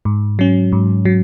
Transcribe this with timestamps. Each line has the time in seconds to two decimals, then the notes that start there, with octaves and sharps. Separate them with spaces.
0.05 G#2
0.39 F#3 C#4
0.72 G#2
1.05 F#3